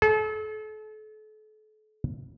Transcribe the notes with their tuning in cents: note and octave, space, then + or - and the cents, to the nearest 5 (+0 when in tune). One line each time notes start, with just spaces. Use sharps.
A4 -35